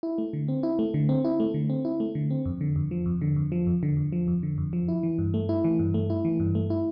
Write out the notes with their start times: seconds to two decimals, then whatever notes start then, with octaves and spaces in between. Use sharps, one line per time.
0.03 E4
0.18 A3
0.33 D3
0.48 C4
0.63 E4
0.79 A3
0.94 D3
1.09 C4
1.25 E4
1.40 A3
1.54 D3
1.70 C4
1.85 E4
2.00 A3
2.15 D3
2.30 C4
2.46 F2
2.61 D3
2.76 F2
2.91 F3
3.06 F2
3.22 D3
3.36 F2
3.52 F3
3.67 F2
3.83 D3
3.97 F2
4.12 F3
4.28 F2
4.43 D3
4.58 F2
4.73 F3
4.88 E4
5.03 E3
5.19 G2
5.34 A3
5.49 E4
5.64 E3
5.79 G2
5.94 A3
6.10 E4
6.25 E3
6.40 G2
6.55 A3
6.70 E4